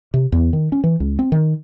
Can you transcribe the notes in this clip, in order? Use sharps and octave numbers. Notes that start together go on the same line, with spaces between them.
C3
E2
D#3
C#4
E3
C#2
C4
D#3